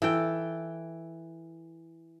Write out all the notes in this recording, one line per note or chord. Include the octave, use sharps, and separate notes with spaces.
E3 A4 G5